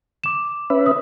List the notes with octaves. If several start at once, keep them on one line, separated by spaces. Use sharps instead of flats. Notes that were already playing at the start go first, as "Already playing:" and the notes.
D6 E7
C#4 B4 E5
D#6